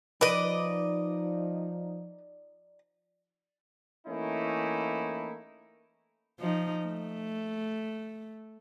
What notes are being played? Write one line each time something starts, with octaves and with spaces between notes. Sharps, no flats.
F3 D#4 B4 D5 D#5
E3 A3 A#3 C#4 D#4 E4
F3 D#4
A3